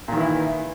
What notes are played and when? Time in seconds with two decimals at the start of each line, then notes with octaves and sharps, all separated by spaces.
0.08 A#2
0.12 D#3
0.16 E3
0.21 E4